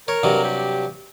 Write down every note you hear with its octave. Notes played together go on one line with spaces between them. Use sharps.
A#4 C#5
G2 C3 F#3
G4